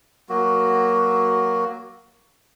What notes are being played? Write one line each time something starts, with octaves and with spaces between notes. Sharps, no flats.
F#3 A#3 F#4